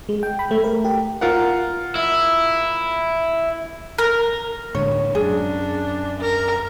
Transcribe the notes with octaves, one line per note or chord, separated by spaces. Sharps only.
G#3
G5
B5
A3
A#4
G4
F4 A#4 F#5
E4
A#4
A2 D3 G#3 C#5
F#2 D4 G#4
A#4